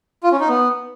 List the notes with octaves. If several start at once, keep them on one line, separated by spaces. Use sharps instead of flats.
F4
C#4
D#4
B3